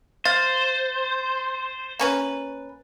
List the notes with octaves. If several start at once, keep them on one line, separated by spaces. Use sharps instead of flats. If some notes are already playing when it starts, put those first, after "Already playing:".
C5 F5 A6
A#3 C#4 B4